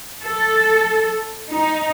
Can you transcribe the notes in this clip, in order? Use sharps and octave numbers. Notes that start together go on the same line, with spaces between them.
A4
D#4